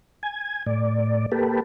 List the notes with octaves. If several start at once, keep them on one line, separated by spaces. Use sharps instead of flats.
G#5
A2 D5
A#3 G4 A4 B4